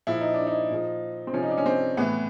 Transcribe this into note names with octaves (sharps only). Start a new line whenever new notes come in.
A#2 F3 E4
D#4
D4
D#4
A#2 F3
C4
C3 F3 C#4
D#4
D4
C#4
C4
A2 E3 B3